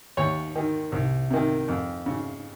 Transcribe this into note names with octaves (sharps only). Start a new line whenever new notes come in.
D#2 C#5
D#3
C2
C3 D#3
F2
C#3